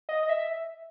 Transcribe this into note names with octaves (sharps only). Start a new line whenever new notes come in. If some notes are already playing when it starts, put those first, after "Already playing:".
D#5
D#5
E5